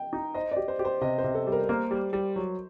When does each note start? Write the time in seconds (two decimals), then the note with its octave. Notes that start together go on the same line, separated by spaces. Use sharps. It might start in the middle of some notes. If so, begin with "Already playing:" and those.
Already playing: D#5 G5
0.13 D#4
0.34 C5 D#5
0.51 G4 D5
0.68 C5
0.79 G4
0.85 C5
1.01 C3 D#5
1.18 C5
1.24 C3
1.35 A4
1.47 G3
1.52 A#4
1.69 A#3 C5
1.91 G3
2.13 G3
2.36 F#3